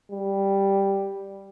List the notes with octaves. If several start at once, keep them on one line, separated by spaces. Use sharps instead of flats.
G3